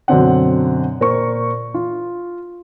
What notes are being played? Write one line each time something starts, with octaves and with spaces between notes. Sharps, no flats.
F#2 B2 D3 C4 D4 F#5
A#2 A#4 C5 C#6
F4